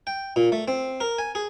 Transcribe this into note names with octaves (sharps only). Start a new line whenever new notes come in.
G5
A#2
A3
C4
A#4
G#5
G#4